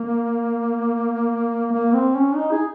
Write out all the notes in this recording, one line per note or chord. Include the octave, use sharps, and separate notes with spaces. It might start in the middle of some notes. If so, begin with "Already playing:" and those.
Already playing: A#3
A#3
C4
C#4
D#4
G#4